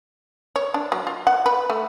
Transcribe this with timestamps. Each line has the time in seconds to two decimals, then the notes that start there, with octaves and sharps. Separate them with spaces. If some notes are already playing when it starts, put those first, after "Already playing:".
0.56 C#5
0.74 D4
0.92 F#3
1.07 F4
1.27 F#5
1.46 B4
1.70 A3